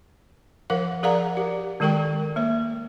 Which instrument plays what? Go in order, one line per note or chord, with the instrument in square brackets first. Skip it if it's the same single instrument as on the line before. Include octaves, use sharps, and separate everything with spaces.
[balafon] F3 A#4 F5 F#5
G#4 A#4 D5 F5 F#5 A#5
G4
D#3 G#3 A4 A#4 G5 C#6
A#3 C#5